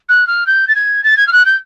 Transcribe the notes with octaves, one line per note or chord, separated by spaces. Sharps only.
F#6
F6
G6
A6
G#6
A6
G#6
F6
F#6
G6